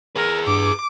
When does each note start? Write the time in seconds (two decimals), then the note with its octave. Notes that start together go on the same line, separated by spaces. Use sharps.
0.16 G#4 A#4 B4
0.47 G2 D6